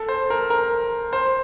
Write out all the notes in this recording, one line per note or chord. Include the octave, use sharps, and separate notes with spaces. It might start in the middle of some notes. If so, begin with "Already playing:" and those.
Already playing: A4
C5
A#4
A#4
C5